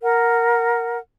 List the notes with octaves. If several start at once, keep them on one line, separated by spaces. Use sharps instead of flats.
A#4 F#5